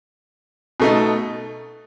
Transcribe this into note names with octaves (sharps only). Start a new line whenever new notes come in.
B2 A3 D#4